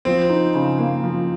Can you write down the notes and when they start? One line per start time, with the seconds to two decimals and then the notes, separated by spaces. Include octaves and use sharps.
0.05 F3 C4
0.29 D#4
0.54 C#3
0.79 A#3
1.04 F3